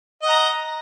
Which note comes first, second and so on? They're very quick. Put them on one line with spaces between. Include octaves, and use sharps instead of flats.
D#5 F#5 A#5